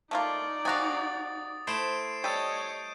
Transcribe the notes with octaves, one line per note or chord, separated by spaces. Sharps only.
A3 A#3 D#4 F4 D5
C3 F#4 F5 G#5 D#6 A6
A3 E4 C5 C7 D7 E7
G3 A4 C#5 D#5 D#6 G6 D#7